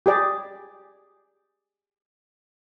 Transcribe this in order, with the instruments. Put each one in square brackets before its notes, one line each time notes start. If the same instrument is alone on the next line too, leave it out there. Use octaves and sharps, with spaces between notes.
[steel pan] G4 G#4 D5